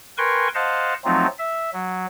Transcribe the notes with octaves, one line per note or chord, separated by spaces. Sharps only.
A#4 B4 G5 G#5 C6 C#6
C5 D#5 F5 F#5 A5
F3 F#3 A3 C4 D#4 F4
E5
F#3